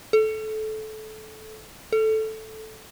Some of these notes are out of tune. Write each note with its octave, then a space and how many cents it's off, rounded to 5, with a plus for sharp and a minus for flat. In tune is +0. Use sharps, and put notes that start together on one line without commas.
A4 -20
A4 -5